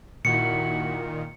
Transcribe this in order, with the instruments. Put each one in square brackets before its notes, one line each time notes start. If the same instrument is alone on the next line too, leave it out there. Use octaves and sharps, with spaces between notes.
[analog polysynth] A#2 D#3 [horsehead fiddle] E4 F#4 [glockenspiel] C#7